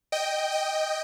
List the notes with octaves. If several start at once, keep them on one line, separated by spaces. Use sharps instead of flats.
D#5 G5
D#5